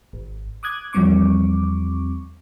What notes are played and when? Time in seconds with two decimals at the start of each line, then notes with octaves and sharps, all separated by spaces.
0.13 G#1
0.63 D6 D#6 F#6 G#6
0.93 E2 F3 G3 C4 C#6 D6